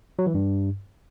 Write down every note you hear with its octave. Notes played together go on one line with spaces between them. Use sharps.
F#3
E3
G2